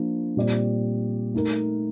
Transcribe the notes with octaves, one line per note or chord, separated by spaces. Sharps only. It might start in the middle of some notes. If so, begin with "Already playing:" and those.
Already playing: F3 A#3 D4
A#2 G3 C4 G4 D5
A3 D#4 A#4